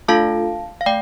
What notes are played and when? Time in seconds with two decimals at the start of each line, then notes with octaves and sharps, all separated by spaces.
0.08 A3 D4 F4 A4 F5 A5
0.81 F5
0.86 A3 D5 G5